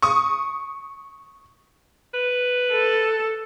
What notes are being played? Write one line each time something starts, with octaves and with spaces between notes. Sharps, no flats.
C#6 D#6
B4
A4